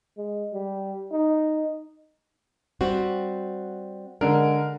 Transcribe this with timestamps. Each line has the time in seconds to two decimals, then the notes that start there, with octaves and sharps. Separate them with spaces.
0.17 G#3
0.54 G3
1.12 D#4
2.81 G3 C4 F#4
4.21 D3 G#3 A#4